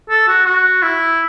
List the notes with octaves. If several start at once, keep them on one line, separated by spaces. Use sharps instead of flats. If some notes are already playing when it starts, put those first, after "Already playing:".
A4
F#4
F#4
E4